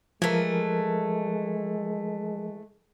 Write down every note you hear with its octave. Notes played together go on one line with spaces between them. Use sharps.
E3 F3 G#3 A3 A#4